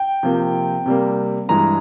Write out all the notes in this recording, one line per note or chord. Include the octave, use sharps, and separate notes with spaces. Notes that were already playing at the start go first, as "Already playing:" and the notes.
Already playing: G5
C3 F3 A#3
C3 G3 A#3
G2 E3 G#3 A#5